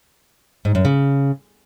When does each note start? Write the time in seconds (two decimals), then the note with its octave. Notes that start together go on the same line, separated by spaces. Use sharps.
0.65 G#2
0.75 F#2
0.85 C#3